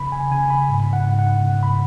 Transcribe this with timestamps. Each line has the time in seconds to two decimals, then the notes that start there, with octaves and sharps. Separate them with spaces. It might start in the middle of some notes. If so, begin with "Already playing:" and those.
Already playing: C#3 B5
0.12 G#5
0.31 C#3 G#5
0.50 B5
0.69 G#2
0.93 F#5
1.06 G#2
1.19 F#5
1.43 C#3
1.63 B5